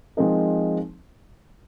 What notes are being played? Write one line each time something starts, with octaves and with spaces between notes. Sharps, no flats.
F3 G#3 C4 D#4 A#4